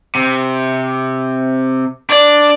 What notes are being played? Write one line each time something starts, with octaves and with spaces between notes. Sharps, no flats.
C3
D4 D5